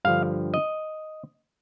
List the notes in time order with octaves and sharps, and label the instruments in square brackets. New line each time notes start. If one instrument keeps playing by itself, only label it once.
[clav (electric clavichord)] G2 D3 F3 F5
D#5